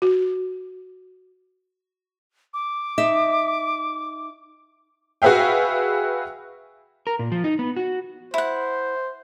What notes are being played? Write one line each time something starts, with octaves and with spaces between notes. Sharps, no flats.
F#4
D6
D#4 E5
F#4 G#4 B4 E5 F5 G5
A#4
A#2
F3
D#4
B3
F#4
E4 C5 F#5